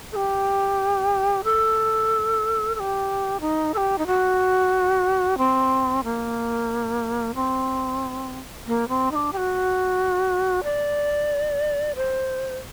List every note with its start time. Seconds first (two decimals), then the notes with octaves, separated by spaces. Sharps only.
0.12 A4
0.16 G4
1.44 A4
2.75 A4
2.80 G4
3.41 D#4
3.74 A4
3.77 G4
3.98 D#4
4.07 F#4
5.38 C4
6.04 A#3
7.35 C4
8.67 A#3
8.88 C4
9.11 D#4
9.15 D4
9.33 G4
9.37 F#4
10.64 D5
11.96 C5